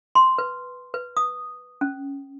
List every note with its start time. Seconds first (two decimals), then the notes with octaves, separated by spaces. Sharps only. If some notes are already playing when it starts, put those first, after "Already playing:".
0.15 C6
0.38 B4
0.94 B4
1.17 D#6
1.81 C#4